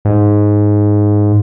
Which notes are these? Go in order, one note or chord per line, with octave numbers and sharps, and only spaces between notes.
G#2